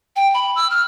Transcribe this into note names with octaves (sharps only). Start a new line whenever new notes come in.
G5
B5
E6
F6